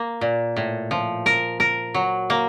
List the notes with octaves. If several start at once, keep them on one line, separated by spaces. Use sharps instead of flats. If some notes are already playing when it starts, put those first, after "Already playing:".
Already playing: A#3
A#2
A2
F3
A#4
A#4
F#3
A#3